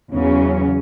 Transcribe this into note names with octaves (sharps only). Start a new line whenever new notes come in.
E2 C#3 F#3 C#4